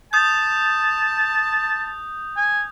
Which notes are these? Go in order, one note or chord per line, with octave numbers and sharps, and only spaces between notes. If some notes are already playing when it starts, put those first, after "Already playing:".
A5 D#6 G6
G#5